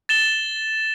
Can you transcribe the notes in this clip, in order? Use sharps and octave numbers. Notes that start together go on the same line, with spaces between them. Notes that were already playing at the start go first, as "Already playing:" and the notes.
A6 E7 G7